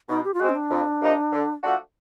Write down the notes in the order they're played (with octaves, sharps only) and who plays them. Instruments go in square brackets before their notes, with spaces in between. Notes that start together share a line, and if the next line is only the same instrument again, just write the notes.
[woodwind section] B2 [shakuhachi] D#4
[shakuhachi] G4
F4
[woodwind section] G#3 C4 [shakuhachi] F#4
[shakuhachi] C#4
D4
[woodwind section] F2
C3 F3 A#3 D#4
D3
F3 A3 D4 F#4